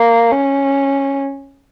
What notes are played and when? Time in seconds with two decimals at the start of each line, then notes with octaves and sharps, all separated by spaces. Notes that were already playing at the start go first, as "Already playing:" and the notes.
Already playing: A#3
0.31 C#4